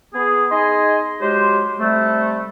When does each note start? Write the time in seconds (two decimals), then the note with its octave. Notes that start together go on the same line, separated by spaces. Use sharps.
0.14 B3 G#4
0.51 D#4 G#4 D#5 G#5 C6
1.21 F#3 G#3 G4 C5
1.80 C3 G3 A3